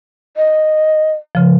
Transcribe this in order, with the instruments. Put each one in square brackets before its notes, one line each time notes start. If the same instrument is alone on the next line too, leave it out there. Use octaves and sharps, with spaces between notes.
[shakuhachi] D#5
[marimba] C#3 F3